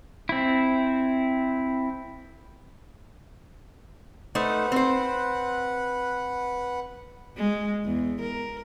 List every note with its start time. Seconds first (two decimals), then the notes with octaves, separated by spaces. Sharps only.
0.29 C4 E4
4.35 A3 D#4 B4 C5 F#5
4.72 C4 C5
7.37 G#3
7.85 E2
8.21 A#4